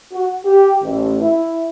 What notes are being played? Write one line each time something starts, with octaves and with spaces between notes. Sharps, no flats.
F#4
G4
A1
E4